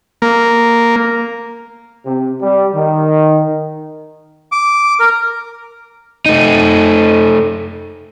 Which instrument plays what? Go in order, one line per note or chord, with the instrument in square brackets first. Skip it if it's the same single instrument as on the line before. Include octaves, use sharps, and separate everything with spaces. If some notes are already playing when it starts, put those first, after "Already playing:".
[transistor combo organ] A#3
[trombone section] C3
G3
D#3
[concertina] D6
A#4
[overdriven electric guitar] A3 D#4